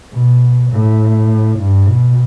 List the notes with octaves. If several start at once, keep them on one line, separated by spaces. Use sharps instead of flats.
B2
A2
G2
B2